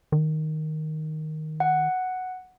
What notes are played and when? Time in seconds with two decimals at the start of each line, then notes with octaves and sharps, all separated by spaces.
0.12 D#3
1.60 F#5